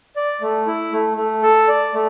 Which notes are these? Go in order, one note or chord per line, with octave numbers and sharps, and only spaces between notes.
D5
A3
E4
A3
A3
A4
D5
A3